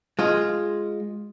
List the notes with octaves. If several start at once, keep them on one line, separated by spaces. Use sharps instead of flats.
G#3 F4